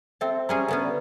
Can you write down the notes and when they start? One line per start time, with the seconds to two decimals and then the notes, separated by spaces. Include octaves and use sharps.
0.21 C4 A4 C5 E5 G5
0.49 G3 C#4 G#4 A#5
0.68 D3 B3 C#4
0.82 B4 D5